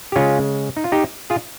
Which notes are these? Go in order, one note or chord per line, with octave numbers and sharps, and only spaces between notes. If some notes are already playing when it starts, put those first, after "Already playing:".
G4
C#3 G#3 C#4 F4
D#4
F4
D#4 G4
F4 G#4